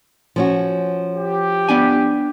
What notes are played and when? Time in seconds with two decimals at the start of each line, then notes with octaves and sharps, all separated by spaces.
0.36 F3 C#4 F#4
1.15 G4
1.69 B3 D4 G#5